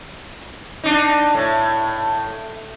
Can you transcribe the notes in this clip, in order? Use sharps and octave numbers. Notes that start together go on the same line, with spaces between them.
D4 D#4
A2